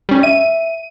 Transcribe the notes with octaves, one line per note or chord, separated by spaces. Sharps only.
G3 C#4
E5 D#7